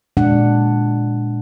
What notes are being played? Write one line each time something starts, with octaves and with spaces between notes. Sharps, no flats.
A#2 G#3 D4 F#5